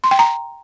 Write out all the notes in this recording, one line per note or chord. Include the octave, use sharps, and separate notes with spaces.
C6
G5
A#5